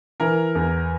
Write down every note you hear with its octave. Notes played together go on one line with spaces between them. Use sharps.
E3 A#4
E2